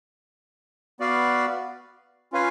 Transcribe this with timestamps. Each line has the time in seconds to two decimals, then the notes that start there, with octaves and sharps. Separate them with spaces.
1.00 B3 F#4 B4 D5 F5
2.32 C#4 F4 B4 F5 G#5